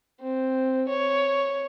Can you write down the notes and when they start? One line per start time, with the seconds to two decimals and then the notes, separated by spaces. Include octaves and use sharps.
0.21 C4
0.88 C#5